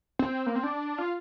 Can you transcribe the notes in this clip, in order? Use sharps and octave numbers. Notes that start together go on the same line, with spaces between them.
C4
A#3
C4
D4
F4